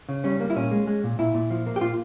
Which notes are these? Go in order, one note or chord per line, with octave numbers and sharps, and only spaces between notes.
C#3
G3 C#4
A#3
E4
A#2 C#4
G#3
G#3
A#2
A#2 E4
A#2
F3
A#3
G4
A#2 F4